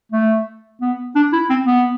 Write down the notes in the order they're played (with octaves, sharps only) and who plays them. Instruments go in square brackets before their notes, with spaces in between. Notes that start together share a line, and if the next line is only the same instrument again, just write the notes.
[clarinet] A3
B3
D4
E4
C4
B3